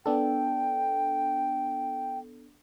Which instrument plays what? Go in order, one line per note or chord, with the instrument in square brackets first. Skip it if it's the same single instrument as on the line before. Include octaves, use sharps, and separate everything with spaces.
[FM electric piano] B3 D4 A4 [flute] G5